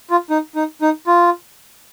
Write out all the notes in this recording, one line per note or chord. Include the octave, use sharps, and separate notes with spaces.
F4
D#4
D#4
D#4
F4